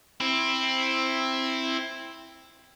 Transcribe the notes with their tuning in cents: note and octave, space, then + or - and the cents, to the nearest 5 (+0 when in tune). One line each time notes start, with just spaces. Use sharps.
C4 +10 E4 +0